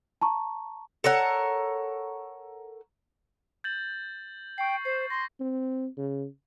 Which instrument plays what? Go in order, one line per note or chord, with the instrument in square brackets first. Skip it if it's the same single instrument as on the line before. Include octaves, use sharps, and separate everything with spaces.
[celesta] A5 A#5 C#6
[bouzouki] A4 A#4 C#5 F#5
[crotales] G6 A6 F#7
[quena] G5 [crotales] C#6 C7
[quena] C5 [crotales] C7
[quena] C6 [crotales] A#6
[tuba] C4
C#3